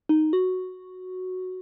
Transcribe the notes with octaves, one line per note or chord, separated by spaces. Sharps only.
D#4
F#4